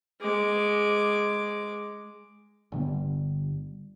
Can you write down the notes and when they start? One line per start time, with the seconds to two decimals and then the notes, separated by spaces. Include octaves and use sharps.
0.21 G#3 D6
2.72 G1 D3 G3 B3